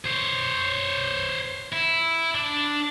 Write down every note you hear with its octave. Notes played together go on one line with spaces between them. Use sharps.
C5 C#5
E4
D4